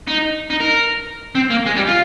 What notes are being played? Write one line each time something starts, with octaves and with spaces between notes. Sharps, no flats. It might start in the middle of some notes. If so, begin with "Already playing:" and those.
D#4
D#4
A#4
C4
A#3
G#3
G3
F4